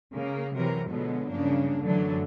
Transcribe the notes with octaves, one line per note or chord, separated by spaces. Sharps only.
C#3 A#3
C3 E3 F#3 A#4
B2 D3 F3 F#3 G#3 B3
G2 C#3 A#3 D4
F#2 D3 E3 F#3 A3 D4